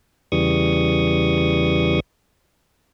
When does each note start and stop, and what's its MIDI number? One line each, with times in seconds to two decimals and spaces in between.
0.32 2.00 40
0.32 2.00 49
0.32 2.00 52
0.32 2.00 55
0.32 2.00 85
0.32 2.00 87